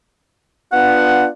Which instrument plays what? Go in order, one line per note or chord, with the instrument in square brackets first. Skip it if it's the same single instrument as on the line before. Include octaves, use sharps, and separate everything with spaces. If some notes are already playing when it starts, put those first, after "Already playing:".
[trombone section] B3 D4 F4 [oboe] F#5